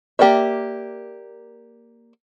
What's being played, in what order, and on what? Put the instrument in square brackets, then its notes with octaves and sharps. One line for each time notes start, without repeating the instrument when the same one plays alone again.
[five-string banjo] A#3 G4 A#4 D5 E5